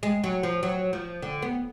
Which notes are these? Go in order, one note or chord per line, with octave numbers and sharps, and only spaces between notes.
G#3
F#3
F3
F#3
F3
D3
B3